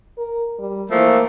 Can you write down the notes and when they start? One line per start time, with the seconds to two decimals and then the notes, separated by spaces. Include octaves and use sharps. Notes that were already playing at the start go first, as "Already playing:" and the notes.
0.17 A#4
0.59 G3
0.91 E3 F3 A3 A#3